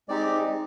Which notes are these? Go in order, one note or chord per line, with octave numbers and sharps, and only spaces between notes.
G#3 C4 D#4 G4 D5